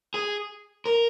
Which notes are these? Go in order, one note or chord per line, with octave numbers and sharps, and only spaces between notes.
G#4
A#4